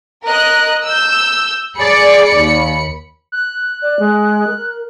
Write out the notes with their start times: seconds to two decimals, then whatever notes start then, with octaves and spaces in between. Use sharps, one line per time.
0.24 A#4 D#5 F#6
0.84 E6 G6
1.77 G#4 D5 B5 C#7
2.36 D#2
3.32 F#6
3.82 D5
3.99 G#3
4.47 A#4